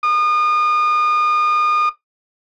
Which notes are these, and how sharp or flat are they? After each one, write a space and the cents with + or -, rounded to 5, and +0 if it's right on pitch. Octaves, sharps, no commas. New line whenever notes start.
D#6 -35